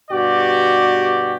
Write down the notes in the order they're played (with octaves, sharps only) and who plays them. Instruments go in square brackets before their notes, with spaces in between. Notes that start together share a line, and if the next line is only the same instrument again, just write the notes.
[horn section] G2 B2 F#4 G4 D5